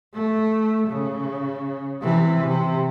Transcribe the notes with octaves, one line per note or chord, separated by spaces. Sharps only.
A3
C#3
C3 E3
C3